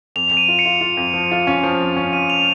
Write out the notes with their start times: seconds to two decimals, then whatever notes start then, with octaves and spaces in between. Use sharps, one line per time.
0.16 F2 F7
0.30 F2 F7
0.37 D#7
0.48 F4
0.59 C#7
0.65 F4
0.81 F4
0.97 F2
1.14 F3
1.31 F4
1.47 C#4
1.64 F3
1.80 F2
1.96 C#4
2.13 C#4 D#7
2.30 F7